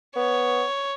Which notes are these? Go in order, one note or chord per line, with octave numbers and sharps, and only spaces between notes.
B3 C#5